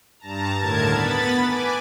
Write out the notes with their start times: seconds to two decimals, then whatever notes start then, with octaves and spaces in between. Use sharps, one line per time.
0.19 G2 A5 A#5
0.58 D#2 A2 D3 A#4 A5 G#6
0.92 B3 B5 A6
1.46 B4 G#5 D6